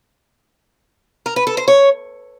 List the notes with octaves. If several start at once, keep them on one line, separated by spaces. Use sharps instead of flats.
A#4
B4
A4
C5
C#5